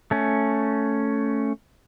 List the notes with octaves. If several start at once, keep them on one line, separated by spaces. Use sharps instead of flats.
A3 C#4